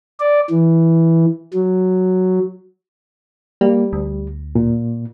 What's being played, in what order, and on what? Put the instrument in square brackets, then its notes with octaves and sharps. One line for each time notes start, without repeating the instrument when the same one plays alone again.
[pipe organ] D5
E3
F#3
[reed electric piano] G3 [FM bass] A#3
[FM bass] D2
[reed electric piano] A#2